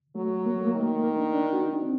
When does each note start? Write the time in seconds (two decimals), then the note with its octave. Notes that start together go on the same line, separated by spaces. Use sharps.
0.15 F#3 A3
0.46 A#3
0.56 A3
0.66 A#3
0.75 D#3
1.04 A#3
1.18 D4
1.33 D4
1.44 D#4
1.53 F#4
1.63 D#4
1.73 D4
1.82 C4